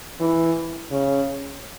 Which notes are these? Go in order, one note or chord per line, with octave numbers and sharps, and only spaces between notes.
E3
C#3